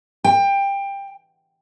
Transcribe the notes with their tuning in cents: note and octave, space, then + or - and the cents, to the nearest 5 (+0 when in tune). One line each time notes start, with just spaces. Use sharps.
G5 +20